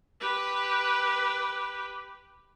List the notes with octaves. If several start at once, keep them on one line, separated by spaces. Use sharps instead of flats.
G4 B4